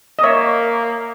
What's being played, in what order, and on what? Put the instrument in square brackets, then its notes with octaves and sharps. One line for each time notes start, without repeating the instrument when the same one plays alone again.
[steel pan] D#5
[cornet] A#3 [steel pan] C#5 E5